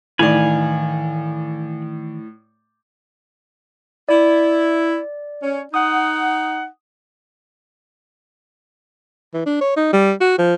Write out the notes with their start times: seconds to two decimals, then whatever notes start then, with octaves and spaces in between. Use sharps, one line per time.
0.19 A2 D#3 E3 D5 F5 G#5 B5
4.09 E4 D5
5.41 C#4
5.74 D#4 F#5 D#6
9.34 E3
9.46 D4
9.61 C#5
9.76 D#4
9.93 G3
10.20 F#4
10.39 F3